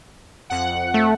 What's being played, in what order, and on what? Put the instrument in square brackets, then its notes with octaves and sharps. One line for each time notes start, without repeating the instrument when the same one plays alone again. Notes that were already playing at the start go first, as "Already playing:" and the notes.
[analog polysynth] F2 F#5
[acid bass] A3